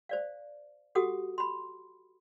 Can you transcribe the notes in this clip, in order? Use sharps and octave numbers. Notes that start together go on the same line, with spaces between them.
C5 D5 F5
F#4 G4 A4 F#5 D#6
B5 C6